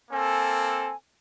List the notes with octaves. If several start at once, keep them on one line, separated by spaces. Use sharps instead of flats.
A#3 C4 A4 G#5